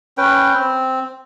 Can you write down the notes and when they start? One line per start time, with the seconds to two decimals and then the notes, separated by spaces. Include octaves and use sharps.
0.18 C#4 B4 G5
0.54 C4